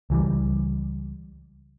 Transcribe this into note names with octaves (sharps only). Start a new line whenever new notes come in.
C#2 E3 F3 G3